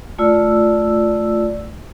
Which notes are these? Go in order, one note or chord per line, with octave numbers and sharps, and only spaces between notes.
A3 F4 D5 E6